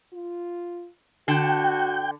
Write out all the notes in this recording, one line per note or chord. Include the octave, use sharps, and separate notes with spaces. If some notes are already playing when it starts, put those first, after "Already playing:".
F4
D3 F#4 G5 A5